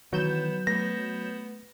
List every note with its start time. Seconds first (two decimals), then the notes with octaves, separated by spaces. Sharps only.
0.13 D#3 E3 F#3 B3 G6 E7
0.67 A3 B3 A#6